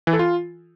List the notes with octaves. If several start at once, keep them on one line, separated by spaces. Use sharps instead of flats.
E3
A4
F4